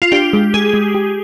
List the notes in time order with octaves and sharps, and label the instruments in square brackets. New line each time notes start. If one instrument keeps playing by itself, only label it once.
[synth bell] F4
[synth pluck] D4 [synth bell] G4
[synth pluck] G#3
[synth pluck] G#3 [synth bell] G#4
[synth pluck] G#3
G4